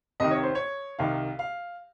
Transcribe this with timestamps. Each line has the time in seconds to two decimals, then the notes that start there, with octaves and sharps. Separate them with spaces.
0.20 C2 C3 D#3 D#5
0.31 C#5
0.43 C5
0.55 C#5
0.99 C2 C3 D#3 F5
1.39 F5